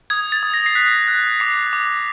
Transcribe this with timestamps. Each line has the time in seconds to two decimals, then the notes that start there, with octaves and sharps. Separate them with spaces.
0.10 D#6 G#6
0.32 A6
0.43 D#6
0.54 A#6
0.66 C7
0.75 F#6 B6
1.08 F#6
1.40 D6 C7
1.73 D6